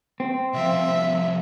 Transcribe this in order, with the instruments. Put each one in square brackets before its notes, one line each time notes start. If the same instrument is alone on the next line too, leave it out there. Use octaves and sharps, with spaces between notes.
[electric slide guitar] C4
[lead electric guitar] C2 F3 [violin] E5